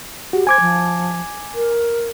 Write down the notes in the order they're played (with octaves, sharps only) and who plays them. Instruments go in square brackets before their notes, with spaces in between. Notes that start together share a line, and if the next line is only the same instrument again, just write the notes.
[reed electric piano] F#4 [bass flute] G4
[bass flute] C5 [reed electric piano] G#5 D6 G#6
[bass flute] F3
A#4